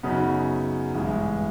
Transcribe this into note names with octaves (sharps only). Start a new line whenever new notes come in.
F#2 C#3 F#3 B3 D#4
A1 G2 E3 G#3